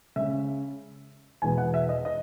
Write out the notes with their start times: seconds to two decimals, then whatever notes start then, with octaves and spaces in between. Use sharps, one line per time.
0.16 C#3 G#3 C#4 E5
1.42 E2 B2 G#3 B3 G#5
1.58 F#5
1.74 E5
1.89 D#5
2.05 D#5